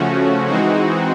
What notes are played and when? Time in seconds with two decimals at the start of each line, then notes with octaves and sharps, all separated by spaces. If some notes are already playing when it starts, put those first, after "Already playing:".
Already playing: C#3 F3 A3 C#4 F#4
0.48 E3 G#3 C4 D#4 F#4